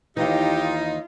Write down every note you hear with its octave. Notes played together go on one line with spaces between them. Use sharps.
D#2 E3 D#4 F4 G4